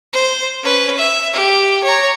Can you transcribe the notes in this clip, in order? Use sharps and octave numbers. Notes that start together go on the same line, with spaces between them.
C5
C#4 B4
E5
G4
C#5 A#5